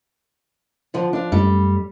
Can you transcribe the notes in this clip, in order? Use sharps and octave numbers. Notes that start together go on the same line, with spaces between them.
D3 F3
F3 D4
F#2 G3 A3